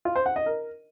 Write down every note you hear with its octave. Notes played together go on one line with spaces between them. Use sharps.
F4
C5
F#5
D#5
A#4